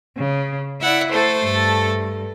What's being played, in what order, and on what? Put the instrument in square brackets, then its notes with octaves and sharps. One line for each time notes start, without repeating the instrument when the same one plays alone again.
[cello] C#3
[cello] E4 D5 [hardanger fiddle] E5 F#5
[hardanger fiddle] A3 A4 [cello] C5
[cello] G2